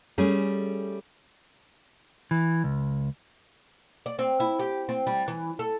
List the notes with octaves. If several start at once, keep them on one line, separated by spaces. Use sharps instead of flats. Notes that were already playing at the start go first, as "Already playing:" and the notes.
G3 A3 C#4 G#4
E3
C#2
D5
C4
E4
G4
C4
G3
E3
A4